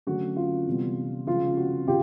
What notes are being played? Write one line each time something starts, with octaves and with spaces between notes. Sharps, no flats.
D3 F#3 A3 C#4 F#4
F4
C3 E3 G3 B3
C#3 F3 G#3 C#4 F4
F#4
C#3 F4 G4